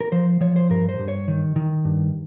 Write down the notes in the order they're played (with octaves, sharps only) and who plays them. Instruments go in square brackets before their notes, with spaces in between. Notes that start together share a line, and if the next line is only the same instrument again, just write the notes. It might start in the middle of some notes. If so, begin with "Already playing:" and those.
[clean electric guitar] A#4
F3 C5
F3 C#5
C5
G2 A#4
C5
G2
C#5
D#3
D#3
G2